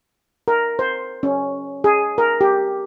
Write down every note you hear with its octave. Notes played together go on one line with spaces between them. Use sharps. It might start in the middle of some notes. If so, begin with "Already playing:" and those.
A#4
C5
C#4
G#4
A#4
G4